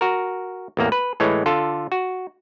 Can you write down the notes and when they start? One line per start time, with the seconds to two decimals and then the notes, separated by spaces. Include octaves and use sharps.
0.01 F#4 A#4
0.77 A1 E2 A#3
0.92 B4
1.20 A2 E3 G#3 C#5
1.46 D3 F4 A4
1.92 F#4